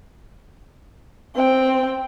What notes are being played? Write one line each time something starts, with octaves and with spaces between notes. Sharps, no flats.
C4 G5